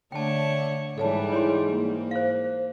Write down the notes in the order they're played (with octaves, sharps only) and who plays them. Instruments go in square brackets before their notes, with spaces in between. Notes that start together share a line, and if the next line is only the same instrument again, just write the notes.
[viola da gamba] D3 A3 C#5 [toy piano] G5 A5
[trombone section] G#2 [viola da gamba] E3 G3 [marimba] A4 C#5 A5
[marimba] E4 [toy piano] C#5 G#5 C6
[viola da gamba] A#3
[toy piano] C5 F5